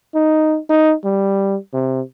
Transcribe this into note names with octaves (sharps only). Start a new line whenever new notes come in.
D#4
D#4
G3
C3